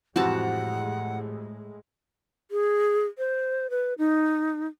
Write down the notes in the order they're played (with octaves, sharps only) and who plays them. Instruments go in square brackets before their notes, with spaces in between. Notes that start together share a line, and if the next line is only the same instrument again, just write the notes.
[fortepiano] F2 C3 E3 [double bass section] A2 G#3 [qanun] F#4 A5 [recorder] F#5
[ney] G#4
C5
B4
D#4